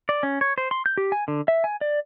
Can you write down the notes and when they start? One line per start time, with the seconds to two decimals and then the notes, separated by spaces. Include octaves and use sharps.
0.09 D5
0.23 C#4
0.41 C#5
0.58 C5
0.71 C6
0.86 G6
0.98 G4
1.12 G#5
1.28 D3
1.48 E5
1.64 G#5
1.81 D5